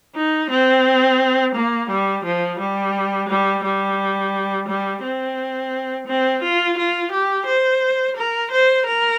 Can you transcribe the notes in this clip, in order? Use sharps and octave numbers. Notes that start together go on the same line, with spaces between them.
D#4
C4
A#3
G3
F3
G3
G3
G3
G3
C4
C4
F4
F4
G4
C5
A#4
C5
A#4